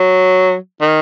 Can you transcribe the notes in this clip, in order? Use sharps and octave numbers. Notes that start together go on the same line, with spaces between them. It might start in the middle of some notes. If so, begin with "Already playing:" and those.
Already playing: F#3
D#3